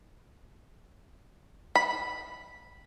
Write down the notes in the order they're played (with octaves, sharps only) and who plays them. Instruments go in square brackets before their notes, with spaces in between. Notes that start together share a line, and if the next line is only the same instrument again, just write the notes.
[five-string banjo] B5